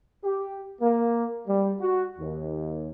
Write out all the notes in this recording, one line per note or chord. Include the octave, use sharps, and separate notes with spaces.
G4
A#3
G3
F#4
D#2